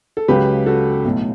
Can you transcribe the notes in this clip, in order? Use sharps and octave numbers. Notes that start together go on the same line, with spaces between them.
A4
C#2 C#3 F#3 G4 B4
F#4 A4
B1 A2 F#3